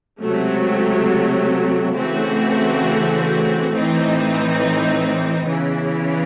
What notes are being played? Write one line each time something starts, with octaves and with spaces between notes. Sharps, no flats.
C#2 C3 F#3 A3
C#3 E3 A3 C4 F#4
A2 E3 C4 D#4
E2 C#3 E3